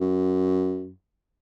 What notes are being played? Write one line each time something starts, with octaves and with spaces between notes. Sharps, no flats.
F#2